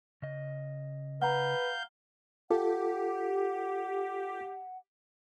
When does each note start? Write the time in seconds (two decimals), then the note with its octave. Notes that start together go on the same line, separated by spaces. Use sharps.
0.22 C#3 D#5
1.22 B4 F5 F#5 A#5 G6
2.50 F4 G4 A4 F#5